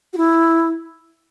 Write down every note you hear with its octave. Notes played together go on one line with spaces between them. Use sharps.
F#4
E4